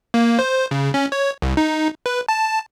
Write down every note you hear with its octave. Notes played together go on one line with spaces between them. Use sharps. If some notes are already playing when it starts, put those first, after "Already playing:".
A#3
C5
C#3
C#4
C#5
C2
D#4
B4
A5